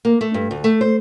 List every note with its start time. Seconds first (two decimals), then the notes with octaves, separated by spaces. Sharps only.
0.05 A#3
0.21 A3
0.34 G2
0.51 D2
0.64 A3
0.81 C5